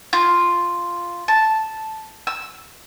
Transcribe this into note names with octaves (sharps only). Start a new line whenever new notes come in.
F4
A5
E6